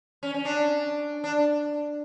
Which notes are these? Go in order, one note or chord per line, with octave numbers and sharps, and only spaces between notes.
C#4
C#4
D4
D4